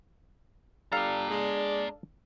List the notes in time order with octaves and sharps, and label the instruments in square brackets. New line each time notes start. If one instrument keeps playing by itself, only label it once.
[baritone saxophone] G3 [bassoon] D4 [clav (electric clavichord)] A4 F5 [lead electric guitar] D5 A#5
[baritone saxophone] G#3